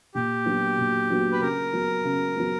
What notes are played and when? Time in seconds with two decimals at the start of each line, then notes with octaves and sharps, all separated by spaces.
0.15 A#2 G4
0.46 F#3 B3 D4 F#4
0.78 A#2
1.10 F#3 B3 D4 F#4
1.32 B4
1.41 C#3 A#4
1.73 F#3 B3
2.04 C#3
2.36 F#3 B3